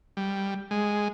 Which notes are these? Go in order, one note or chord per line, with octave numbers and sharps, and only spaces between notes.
G3
G#3